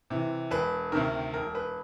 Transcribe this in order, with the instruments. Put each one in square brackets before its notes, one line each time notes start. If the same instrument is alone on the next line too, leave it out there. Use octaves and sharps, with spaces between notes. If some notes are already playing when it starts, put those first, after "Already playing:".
[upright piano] C3 E3
E1 B4
D2 C3 D#3 A#4
E1 A#4
B4